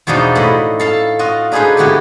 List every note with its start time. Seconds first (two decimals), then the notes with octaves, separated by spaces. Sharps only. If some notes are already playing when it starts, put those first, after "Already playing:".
0.07 E2 B2 F3 D4 D#4
0.35 A2 D#5 F#5 B5
0.79 A4 F5 A5
1.19 F4 F#4 D#5
1.52 D4 D#4 G#4 A4 B4 C5
1.77 D3 E3 B3 F#4 G4